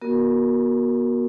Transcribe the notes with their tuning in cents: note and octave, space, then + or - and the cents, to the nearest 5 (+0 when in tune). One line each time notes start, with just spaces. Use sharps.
B3 -40 F#4 +0 A#4 -5